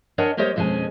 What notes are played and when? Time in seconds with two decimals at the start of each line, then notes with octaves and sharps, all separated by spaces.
0.18 D4 A#4 C#5 D#5 F#5 G#5
0.37 G3 A#3 G4 C5 C#5 D#5
0.56 F2 B2 G#3 C#4 G#5